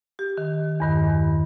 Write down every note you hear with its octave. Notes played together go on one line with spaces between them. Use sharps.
G4
D#3
E2 G2 D#3